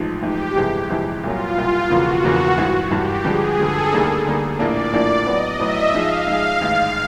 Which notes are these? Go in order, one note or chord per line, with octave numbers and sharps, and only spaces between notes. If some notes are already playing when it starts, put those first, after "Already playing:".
Already playing: A1 G#2 F3
A1 G#2 F3 G4
G1 F2 C3 E3 G#3
G1 F2 C3 E3 G#3
C2 A#2 F#3 F4
C2 A#2 F#3
E1 E2 C#3 F3 A#3 F#4
E1 E2 C#3 F3 A#3
G#1 G2 E3
G#1 G2 E3 G4
G2 D3 F3 G#3 G#4
G2 D3 F3 G#3 A4
D2 D3 G3 A#3 D#4 A#4
D2 D3 G3 A#3 D#4
A#1 A2 F3 A#3 D4 D5
A#1 A2 F3 A#3 D4
A2 F#3 B3 D#5
A2 F#3 B3 E5
G#2 F3 G#3 F5
G#2 F3 G#3
A1 G#2 D#3 G#3